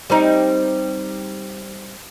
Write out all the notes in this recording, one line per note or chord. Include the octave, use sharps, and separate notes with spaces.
G3 C4 D#4